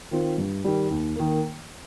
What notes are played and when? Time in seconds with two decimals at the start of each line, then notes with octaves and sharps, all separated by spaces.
0.11 D#3 C4 F4
0.38 G2
0.64 D#3 G3
0.91 D#2
1.16 D#3 A#3